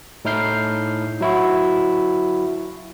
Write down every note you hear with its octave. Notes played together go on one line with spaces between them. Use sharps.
A2 D#4 E4 F6 G6 C7
F#3 E4 F#4